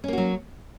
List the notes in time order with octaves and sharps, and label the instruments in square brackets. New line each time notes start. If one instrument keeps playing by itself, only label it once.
[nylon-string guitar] C#4
A#3
F#4
F#3